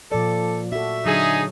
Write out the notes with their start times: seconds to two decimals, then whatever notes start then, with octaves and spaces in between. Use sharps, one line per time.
0.12 A#2 F3 A4 D5
0.72 F#4 A4 E5
1.06 D3 F#3 D#4 G#4